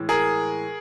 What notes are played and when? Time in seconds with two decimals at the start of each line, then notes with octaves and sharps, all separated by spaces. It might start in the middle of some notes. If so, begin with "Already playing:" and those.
Already playing: A2 E3 G#3
0.09 G#4 A#4